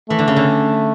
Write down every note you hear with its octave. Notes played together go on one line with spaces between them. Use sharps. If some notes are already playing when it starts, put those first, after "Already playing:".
E3 A3
D3
C#3
D3